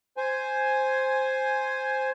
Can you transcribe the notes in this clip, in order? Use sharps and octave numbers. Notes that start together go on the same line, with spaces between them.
C5 G#5